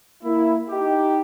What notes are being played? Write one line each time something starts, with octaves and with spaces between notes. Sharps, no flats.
A#3 E4
D#4 G4